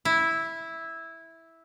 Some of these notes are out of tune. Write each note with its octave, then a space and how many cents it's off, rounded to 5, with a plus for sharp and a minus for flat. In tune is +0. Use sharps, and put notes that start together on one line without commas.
E4 -5